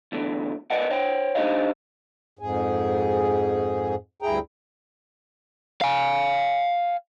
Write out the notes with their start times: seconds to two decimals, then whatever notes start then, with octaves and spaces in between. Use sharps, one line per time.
0.12 E2 A2 D3
0.70 A#4 B4 D5 D#5 F#5
0.90 C5 C#5 G5
1.35 D4 D#4 G4 C5 D#5 F5
2.39 F2 G#2 G#4
4.22 D2 G2 E4 G#4 G5 A#5
5.81 F5 G#5